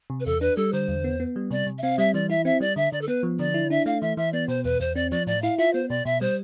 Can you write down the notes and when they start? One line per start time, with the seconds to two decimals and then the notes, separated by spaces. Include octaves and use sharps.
0.10 C3
0.20 B4
0.26 E2 A4
0.41 D4 B4
0.57 G3 A4
0.73 D3 C5
0.88 E2
1.04 B3
1.20 B3
1.36 G3
1.51 C3 D5
1.67 C3
1.78 E5
1.82 C4 F5
1.98 G3 E5
2.14 E3 D5
2.29 E4 E5
2.45 C4 E5
2.60 G3 D5
2.76 D3 E5
2.92 D3 D5
3.01 A4
3.08 B3 B4
3.23 F3
3.39 D3 D5
3.54 E4
3.70 D4 E5
3.86 A3 F5
4.01 E3 E5
4.17 E3 E5
4.33 B3 D5
4.48 B2 C5
4.64 E2 B4
4.80 E2 C5
4.95 C4 D5
5.11 F3 D5
5.27 A2 D5
5.42 E4 F5
5.58 F4 E5
5.74 B3 C5
5.89 B2 D5
6.05 B2 E5
6.21 G3 C5